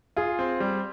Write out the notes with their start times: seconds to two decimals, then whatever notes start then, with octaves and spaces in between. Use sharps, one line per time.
0.16 F4 G#4
0.39 C4
0.60 G3